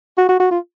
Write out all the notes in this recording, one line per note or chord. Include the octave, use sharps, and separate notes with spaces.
F#4
F#4
F#4
F4